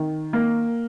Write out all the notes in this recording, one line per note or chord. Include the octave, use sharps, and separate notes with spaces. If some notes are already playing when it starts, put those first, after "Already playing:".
Already playing: D#3
A#3